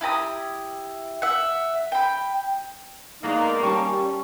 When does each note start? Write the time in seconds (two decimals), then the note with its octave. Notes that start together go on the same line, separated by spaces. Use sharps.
0.01 E4 G4 A#5 D#6
1.22 E5 F#5
1.92 G5 B5
3.23 A2 G#3 A#3 B3 D#4 D5
3.63 G3 C#4 G5 A5 C#6